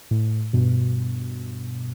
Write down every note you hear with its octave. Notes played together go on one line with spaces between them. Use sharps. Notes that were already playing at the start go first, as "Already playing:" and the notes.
A2
G2 B2